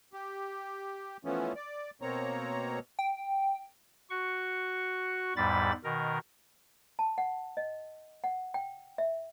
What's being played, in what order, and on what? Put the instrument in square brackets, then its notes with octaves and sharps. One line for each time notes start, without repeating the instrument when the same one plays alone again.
[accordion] G4
E3 F3 A3 B3 C#4
D5
B2 A#3 C4 C#5 A#5
[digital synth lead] G5
[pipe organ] F#4 C#6
E2 G#2 G3 B5 A6
B2 D#3 A#4
[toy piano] A5
F#5
D#5
F#5
G5
E5